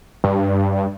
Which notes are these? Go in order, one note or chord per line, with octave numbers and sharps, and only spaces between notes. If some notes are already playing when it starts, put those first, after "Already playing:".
G2